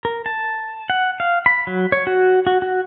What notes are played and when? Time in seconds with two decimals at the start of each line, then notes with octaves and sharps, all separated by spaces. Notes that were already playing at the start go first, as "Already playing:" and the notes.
0.05 A#4
0.26 A5
0.90 F#5
1.20 F5
1.46 B5
1.67 F#3
1.92 C#5
2.07 F#4
2.47 F#4
2.62 F#4